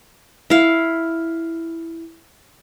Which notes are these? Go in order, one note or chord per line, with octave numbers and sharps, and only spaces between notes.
E4 F5